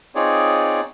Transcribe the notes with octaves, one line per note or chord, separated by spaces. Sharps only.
C4 D#4 F4 G#4 C#5 D5